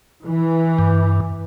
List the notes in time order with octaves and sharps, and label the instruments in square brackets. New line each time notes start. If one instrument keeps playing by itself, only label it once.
[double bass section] E3
[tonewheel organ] G2